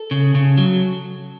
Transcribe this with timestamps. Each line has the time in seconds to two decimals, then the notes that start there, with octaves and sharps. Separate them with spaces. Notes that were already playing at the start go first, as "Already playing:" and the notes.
Already playing: A4
0.11 C#3
0.35 C#3
0.57 F#3